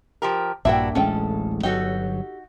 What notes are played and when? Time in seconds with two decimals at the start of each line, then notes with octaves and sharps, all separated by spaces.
0.22 F3 G4 A#4
0.65 A#1 G2 A#2 D4 E4 F#4 E5 G5
0.95 D1 A1 G#3 C#4 A4 G5
1.63 G1 F#3 D#4 F#4 G4 A4